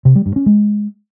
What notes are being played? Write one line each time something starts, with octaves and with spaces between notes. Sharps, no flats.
C3
G3
G2
C#4
G#3